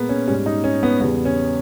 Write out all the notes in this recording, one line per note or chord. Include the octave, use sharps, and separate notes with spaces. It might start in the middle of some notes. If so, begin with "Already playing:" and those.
Already playing: A#2 G#3 A#3 B3
C#4
G#2 G3 C#4
D#4
C#4
B3
E2 C#3 G3 B3
C#4